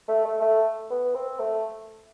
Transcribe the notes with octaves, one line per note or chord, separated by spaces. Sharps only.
A3
A3
A3
B3
C4
A3